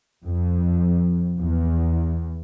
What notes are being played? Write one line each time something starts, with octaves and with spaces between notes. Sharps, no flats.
F2
E2